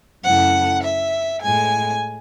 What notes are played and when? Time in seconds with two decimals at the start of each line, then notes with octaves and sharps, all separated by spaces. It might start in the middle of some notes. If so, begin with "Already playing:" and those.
0.23 F#2 C#3 E3 A3 F#5
0.83 E5
1.41 A2 G#3 G#5